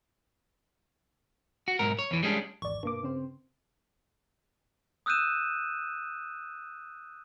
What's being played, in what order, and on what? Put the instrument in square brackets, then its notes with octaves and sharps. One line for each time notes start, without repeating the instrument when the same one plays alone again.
[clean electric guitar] F#4
B1 G#2 A#4
C#5
E2 E3
G3 G#3 C#4 D4
[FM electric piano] G#1 E2 D5 [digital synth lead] C#6
[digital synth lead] G2 [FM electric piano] B2 A#3 D6
[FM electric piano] C#3 C4 C5
[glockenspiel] D#6 E6 F#6 G6 D#7 E7